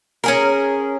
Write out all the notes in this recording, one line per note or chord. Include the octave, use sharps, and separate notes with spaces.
C#4 G#4 A#4